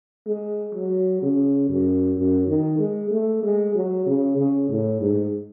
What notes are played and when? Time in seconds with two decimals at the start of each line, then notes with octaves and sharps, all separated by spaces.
0.27 G#3
0.75 F#3
1.22 C#3
1.69 F#2
2.17 F#2
2.47 D#3
2.79 G#3
3.11 A3
3.43 G#3
3.75 F#3
4.06 C#3
4.38 C#3
4.70 A2
5.00 G#2